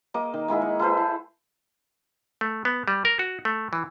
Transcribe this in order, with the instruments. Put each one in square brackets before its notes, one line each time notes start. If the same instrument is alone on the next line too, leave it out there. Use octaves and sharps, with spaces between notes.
[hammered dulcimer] A#3 D#5 D6
D#3
G#3 A#3 E4 G#4
F#5
E4 A4 B4 C5
A5
[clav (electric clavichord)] A3
B3
G3
A#4
F#4
A3
E3